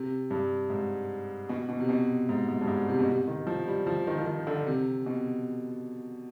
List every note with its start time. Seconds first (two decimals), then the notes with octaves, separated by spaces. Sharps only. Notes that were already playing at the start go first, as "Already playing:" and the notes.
Already playing: C3
0.31 G2
0.70 G#2
1.49 B2
1.69 B2
1.80 C3
1.89 B2
2.29 G#2
2.48 G#2
2.61 G2
2.68 G#2
2.89 C3
2.99 B2
3.08 C3
3.27 D#3
3.47 F3
3.68 G3
3.87 F3
4.07 D#3
4.18 F3
4.26 D#3
4.47 D3
4.67 C3
5.06 B2